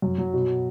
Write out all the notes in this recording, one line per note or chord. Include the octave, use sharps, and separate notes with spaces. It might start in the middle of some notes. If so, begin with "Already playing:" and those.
F#2
F#3
B2